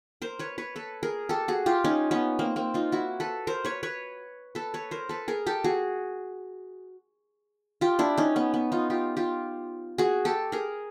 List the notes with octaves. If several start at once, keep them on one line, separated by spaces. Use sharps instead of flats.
A#4 C5
B4 C#5
B4 C#5
A4 B4
G#4 A#4
G4 A4
F#4 G#4
F4 G4
C#4 D#4
B3 C#4
A#3 C4
A#3 C4
D#4 F4
E4 F#4
A4 B4
A#4 C5
B4 C#5
B4 C#5
A4 B4
B4 C#5
A#4 C5
A4 B4
G#4 A#4
G4 A4
F#4 G#4
F4 G4
D4 E4
C#4 D#4
B3 C#4
B3
D#4 F4
F4 G4
F4 G4
F#4 G#4
G4 A4
G#4 A#4